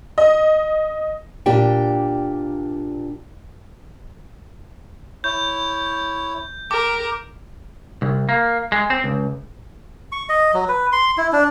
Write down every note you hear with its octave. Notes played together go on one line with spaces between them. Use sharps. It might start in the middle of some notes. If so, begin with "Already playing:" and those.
D#5
A#2 D4 G4 G5
E4 C#5 G6
A#4 G5 D6
C2
A#3
G#3
C4
C#2
C#6
D#5
F#3
B4
C6
E4
D4